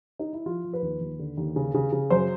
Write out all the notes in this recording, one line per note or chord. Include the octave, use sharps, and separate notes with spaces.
D#4
E4
F3 F4
F3
B4
D#2
D#2
D3
D#2
C#3
C#3
C#3
F#2 C5